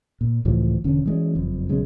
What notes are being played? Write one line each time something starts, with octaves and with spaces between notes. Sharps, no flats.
A#2
C#2 A2 E3 F3
E1 D3 C#4
E3 G#3 C#4
F#1 F2
B1 C#3 G#3